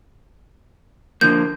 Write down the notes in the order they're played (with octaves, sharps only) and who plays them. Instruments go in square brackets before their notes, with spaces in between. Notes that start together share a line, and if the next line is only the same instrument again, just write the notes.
[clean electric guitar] D3 F3 A#3 [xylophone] G6